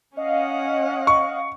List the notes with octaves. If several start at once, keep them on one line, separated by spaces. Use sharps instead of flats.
C#4 D#5 F5 F#5
C#6